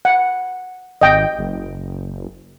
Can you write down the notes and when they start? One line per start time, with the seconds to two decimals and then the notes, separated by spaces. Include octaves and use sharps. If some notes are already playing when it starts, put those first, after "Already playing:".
0.05 F#5
1.01 G#1 D#5 G5
1.39 F#1